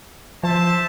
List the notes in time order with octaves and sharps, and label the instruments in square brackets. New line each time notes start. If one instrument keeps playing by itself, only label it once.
[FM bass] F3 [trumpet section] C5 E5 A5